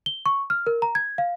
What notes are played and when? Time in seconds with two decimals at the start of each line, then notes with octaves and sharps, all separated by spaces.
0.06 G7
0.26 C#6
0.50 F6
0.67 A#4
0.82 A#5
0.95 G#6
1.18 F5